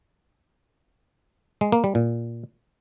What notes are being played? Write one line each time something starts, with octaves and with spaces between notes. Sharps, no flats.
G#3
A#3
G3
A#2